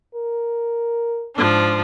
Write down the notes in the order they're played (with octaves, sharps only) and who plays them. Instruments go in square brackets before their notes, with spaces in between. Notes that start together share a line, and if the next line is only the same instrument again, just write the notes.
[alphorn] A#4
[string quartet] G#2 F3 D4